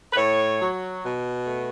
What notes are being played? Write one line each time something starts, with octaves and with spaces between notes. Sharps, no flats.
B4
A2 C#5
F#3
B2
A3